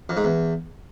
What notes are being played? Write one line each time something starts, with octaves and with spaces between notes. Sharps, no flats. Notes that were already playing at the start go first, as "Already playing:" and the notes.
F2
G#2
E2